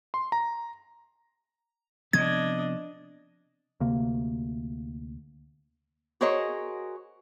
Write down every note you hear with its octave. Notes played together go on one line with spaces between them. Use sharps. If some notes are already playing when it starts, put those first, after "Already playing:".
C6
A#5
C3 F3 B3 D4 D#5 G#6
D2 C3 A#3
F#4 G#4 A#4 C5 C#5 D#5